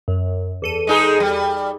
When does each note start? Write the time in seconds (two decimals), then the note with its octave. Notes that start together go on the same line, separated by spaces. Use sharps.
0.08 F#2
0.62 E2 A4 D#7
0.87 G#3 D#4 G#4
1.20 G3